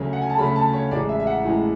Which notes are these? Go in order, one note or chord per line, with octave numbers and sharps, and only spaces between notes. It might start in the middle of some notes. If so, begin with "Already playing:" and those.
Already playing: D2 C#3 F#3 A3
F#5
G#5
A5
D2 C#3 F#3 A3 B5
A5
C#5
A1 A2 G#3 D5
E5
E5
F#5
A1 A2 G#3